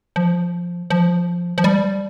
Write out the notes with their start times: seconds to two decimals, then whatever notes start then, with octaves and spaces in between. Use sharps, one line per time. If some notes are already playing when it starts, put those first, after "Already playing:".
0.16 F3
0.90 F3
1.58 F3
1.64 G3